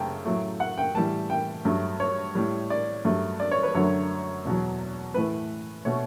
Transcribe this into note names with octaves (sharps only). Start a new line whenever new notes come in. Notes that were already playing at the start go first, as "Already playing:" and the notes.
Already playing: F#2 C#3 A3 G5 A5
A2 F#3 A3
F#5
G5
A2 E3 G3 A5
G5
G2 F#3 A3
C#5
A2 G3
D5
G2 F#3 A3
D5
C#5
B4
F#2 D3 F#3 A3 C#5
E2 B2 F#3
A2 E3 A3 B4
B2 A3 C#5